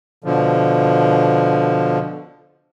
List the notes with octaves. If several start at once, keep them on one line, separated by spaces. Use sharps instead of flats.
B2 D3 F3